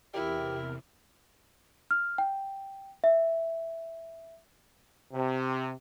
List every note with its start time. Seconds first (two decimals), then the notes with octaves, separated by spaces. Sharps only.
0.14 E2 C3 E4 G4 A#4
1.91 F6
2.18 G5
3.04 E5
5.12 C3